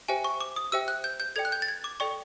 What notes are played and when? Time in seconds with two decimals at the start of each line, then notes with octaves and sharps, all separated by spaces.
0.08 G4 C5 E5 G5 G#5
0.24 C#6
0.41 D6
0.56 D#6
0.72 G4 C5 E5 G5 E6
0.88 F#6
1.04 G6
1.20 G6
1.36 A4 D5 G5 G#6
1.45 F#6
1.52 G6
1.62 A6
1.68 G#6
1.84 D6
2.00 A4 D5 G5 C#6